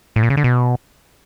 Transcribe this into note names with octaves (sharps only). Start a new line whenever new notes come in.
A2
A#2
C#3
D3
B2